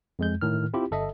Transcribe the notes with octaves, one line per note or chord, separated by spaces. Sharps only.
F2 G#3 G6
A2 D#3 F6
C4 E4 F4 G4
G1 A4 D#5 E5